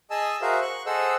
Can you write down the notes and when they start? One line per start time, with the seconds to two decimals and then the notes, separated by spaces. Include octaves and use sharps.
0.11 G#4 D#5 G#5 A5 E6
0.42 F#4 G#4 A#4 C5 E5 F5
0.62 C#6 F#6
0.86 G#4 A4 C5 D#5 F#5 E6